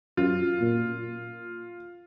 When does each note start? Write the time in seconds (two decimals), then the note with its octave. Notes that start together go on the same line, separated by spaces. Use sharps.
0.17 F#2 F4
0.61 A#2